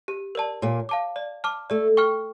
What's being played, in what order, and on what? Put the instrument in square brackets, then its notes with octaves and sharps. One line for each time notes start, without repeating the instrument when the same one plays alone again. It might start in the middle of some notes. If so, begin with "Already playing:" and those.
[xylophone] G4
A#4 D5 A5
[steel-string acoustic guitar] A#2 A#3 [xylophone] C#5
[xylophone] F5 A5 D6
D5
A5 D6 F6
[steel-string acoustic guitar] A3 [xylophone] D5
[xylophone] G5 C#6 F6